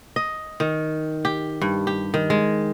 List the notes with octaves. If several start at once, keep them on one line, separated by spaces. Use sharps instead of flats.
D#5
D#3
G4
G2
G4
D#3
G#3